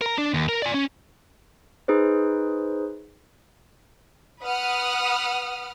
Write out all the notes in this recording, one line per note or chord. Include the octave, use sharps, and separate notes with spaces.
A#4 A#5
D4
D#2
A#4
D5 G#5
C#4
D#4 G#4 B4 C5
B4 F#5 D#6 F6